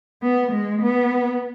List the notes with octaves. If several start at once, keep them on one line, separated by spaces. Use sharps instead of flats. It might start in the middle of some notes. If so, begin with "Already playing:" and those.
B3
G#3
B3